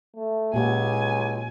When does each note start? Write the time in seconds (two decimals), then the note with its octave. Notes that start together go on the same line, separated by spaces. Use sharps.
0.16 A3
0.54 C#2 A#2 G4 F#5 G#5